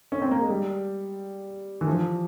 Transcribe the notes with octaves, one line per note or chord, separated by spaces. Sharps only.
C#4
C4
A#3
G#3
G3
E3
F3